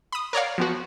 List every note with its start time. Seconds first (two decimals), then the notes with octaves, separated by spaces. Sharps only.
0.12 B5 D#6
0.33 A#4 C#5 D5 F5
0.58 F3 B3 F#4